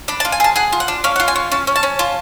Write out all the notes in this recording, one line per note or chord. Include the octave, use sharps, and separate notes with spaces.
D4 B5
A5
F4
G#5
G#4 A5
G#4 F#5
F4
F#5
D4
C#4 F5
F#5
F4
G#5
C#4
C#4 A5
C#4
A5
C#4
F4 A5